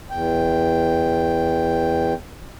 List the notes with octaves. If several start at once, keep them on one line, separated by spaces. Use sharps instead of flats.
E2 G5